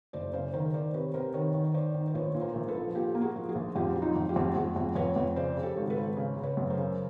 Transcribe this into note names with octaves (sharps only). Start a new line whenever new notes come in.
F#1 C5 D5
C#3 C5 D5
D#3 A#4 C5
D#3 C5 D5
C3 B4 C#5
C3 A#4 C5
D#3 B4 C#5
D#3
C#5
D#3 C5 D5
D#3
C5
A#1 B4 C#5
A#2
A#4 C5
A#1
A4 B4
F3
A#2 G4 A4
A#3
F#4 G#4
F3
F#4 G#4
A#1
F2 F4 G4
F#3
D#4 F4
F2
F4 G4
F2
F2 F#4 G#4
F2
F2 B4 C#5
F2
C#3 C5 D5
C#3
G4 A4
G#1
A4 B4
G#1
C#3
C#3
B4 C#5
F#2
A#4 C5
C#3